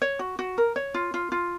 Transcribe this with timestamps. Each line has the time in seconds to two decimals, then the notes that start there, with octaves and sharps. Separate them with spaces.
0.02 C#5
0.19 F#4
0.39 F#4
0.58 A#4
0.76 C#5
0.94 F4
1.14 F4
1.32 F4